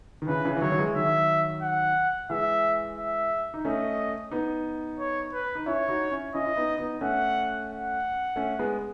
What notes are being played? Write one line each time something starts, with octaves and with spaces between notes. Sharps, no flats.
D#3
C#3 E3 B4
C#3 E3
E3
D#3 F#3 C#5
F#3
E3 G#3
D#3 F#3 E5
F#5
E3 G#3 E5
E5
D#4
A3 C#4 D#5
B3 D#4
C#5
B4
D#4
C#4 E4 C#5
D#4 F#4
C#4 E4
C#4 E4 D#5
E4
B3 D#4
B3 D#4
A3 C#4 F#5
F#5
A3 C#4
G#3 B3